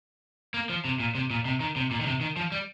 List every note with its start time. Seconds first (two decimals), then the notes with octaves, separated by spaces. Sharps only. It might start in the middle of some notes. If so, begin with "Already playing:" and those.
0.54 A#3
0.69 F3
0.85 C3
1.00 A#2
1.15 C3
1.31 A#2
1.45 C3
1.60 D#3
1.76 C3
1.91 A#2
2.01 D#3
2.06 C3
2.21 D#3
2.37 F3
2.52 G3